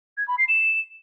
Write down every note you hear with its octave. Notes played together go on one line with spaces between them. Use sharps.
G#6
B5
C7
E7